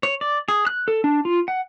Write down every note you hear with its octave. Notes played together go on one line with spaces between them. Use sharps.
C#5
D5
G#4
F#6
A4
D4
F4
F#5